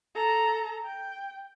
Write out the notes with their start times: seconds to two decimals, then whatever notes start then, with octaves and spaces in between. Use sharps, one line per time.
0.15 A4 A#5
0.85 G5